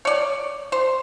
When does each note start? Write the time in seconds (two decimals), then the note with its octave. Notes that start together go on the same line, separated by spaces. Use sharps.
0.05 C#5 D5
0.72 C5